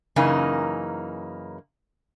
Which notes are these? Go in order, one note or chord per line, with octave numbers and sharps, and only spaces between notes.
F#2 C#3 E3 A#3 D#4 G#5